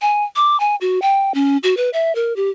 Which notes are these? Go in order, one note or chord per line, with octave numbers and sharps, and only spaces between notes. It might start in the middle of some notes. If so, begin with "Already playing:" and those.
G#5
D6
G#5
F#4
G5
C#4
F#4
B4
E5
A#4
G4